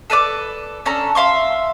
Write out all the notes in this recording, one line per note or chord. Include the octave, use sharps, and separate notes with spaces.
A4 B4 D5 D6
C#4 D4 A4 A#5
E5 F5 C6 C#6